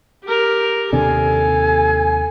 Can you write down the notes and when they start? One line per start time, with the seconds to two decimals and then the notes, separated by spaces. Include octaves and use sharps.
0.24 G4 A#4
0.93 D#2 C3 D4 A4 G#5